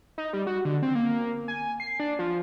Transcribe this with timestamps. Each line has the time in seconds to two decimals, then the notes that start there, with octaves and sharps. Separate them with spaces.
0.18 D#4
0.33 G3
0.47 F#4
0.65 D3
0.82 C4
0.95 A#3
1.48 G#5
1.80 C7
2.00 D4
2.19 F3